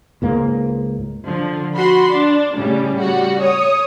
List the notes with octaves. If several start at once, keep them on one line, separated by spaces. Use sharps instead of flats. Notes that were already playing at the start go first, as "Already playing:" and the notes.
C#2 G#2 A#3
D3 F3
F#4 B5 C6
D4
A2 C#3 G3 C#4
G3 F#4
C#5 D#6